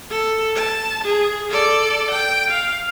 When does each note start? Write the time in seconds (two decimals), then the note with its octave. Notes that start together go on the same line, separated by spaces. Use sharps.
0.10 A4
0.55 A5
1.04 G#4
1.49 A4 D5
2.11 G5
2.50 F5